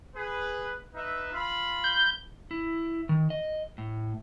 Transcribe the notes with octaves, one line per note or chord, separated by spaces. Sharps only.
G#4 B4
D#4 B4 E5
F4 B5
G6
E4
D#3
D#5
A2